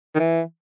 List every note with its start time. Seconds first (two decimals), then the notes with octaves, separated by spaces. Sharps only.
0.15 D#3
0.19 E3